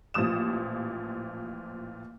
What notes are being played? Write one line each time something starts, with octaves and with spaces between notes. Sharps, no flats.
A1 A#2 F3 D#6 E7